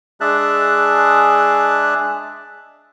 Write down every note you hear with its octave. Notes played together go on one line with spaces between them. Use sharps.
G#3 D4 G#4 E5 A5 F#6